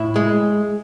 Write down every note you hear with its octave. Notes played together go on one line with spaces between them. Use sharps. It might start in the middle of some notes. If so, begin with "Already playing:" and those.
Already playing: A2 E4
G#3